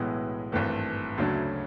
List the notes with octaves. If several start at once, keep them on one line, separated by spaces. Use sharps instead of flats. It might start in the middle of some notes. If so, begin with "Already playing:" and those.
Already playing: B1 A2 E3 G#3 B3
G#1 G2 E3 A3
D2 C#3 F#3 A3 D4